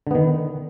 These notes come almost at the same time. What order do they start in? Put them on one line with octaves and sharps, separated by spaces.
D3 B3 D#3